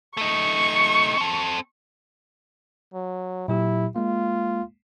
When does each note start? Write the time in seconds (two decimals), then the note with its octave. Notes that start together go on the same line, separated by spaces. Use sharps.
0.17 A3 D#4 C#6
1.17 C4 A4
2.94 F#3
3.48 A#2 F#3 E4 G4
3.96 G#3 A#3 F4